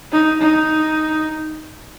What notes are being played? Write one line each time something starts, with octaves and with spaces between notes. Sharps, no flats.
D#4
D#4